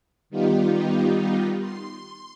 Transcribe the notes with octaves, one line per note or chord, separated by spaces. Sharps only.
D#3 G3 B3 D#4 F4 G4
C6